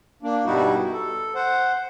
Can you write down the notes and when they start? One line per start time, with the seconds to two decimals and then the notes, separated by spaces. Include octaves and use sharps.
0.23 A#3 D4
0.45 G2 B2 G3 D#4 E4 F#4
0.93 A4
1.35 C5 F#5